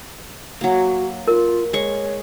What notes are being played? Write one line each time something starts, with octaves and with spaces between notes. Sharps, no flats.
F#3 A#3 F#4
F4 A#4
G#3 C#5 C#6